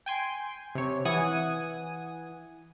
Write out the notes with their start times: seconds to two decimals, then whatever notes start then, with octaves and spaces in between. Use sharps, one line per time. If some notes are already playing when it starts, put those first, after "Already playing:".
0.06 G5 G#5 C6
0.75 C3 C#5
1.05 E3 F#5 G#5 D#6